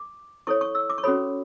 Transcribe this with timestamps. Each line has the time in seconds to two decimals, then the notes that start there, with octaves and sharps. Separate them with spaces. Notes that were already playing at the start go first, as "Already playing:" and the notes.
Already playing: D6
0.47 E4 A4 C#5 C#6
0.61 C#6
0.75 E6
0.90 D6
0.98 C#6
1.03 C#4 F#4 A4 C#5 B5